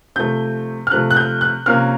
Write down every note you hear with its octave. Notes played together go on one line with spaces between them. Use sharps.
C3 F3 A3 G6
F6
C3 F3 A3 F#6
F#6
G6
F#6
C3 F3 A#3 C#4 F6